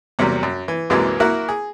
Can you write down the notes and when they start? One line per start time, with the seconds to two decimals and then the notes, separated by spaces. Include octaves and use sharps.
0.19 E2 C3 F#3 G3 A#3
0.43 F#2
0.68 E3
0.90 C2 F#2 E3 F#3 G#3 A#3
1.20 A#3 E4 F#4 A#4 F#5
1.49 G#4